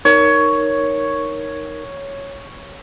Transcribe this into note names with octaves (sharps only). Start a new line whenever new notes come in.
D#4 A#4 C#5